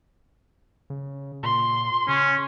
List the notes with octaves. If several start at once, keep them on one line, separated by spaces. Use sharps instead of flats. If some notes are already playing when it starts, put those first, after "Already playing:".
C#3
A#2 C6
C#3 C#4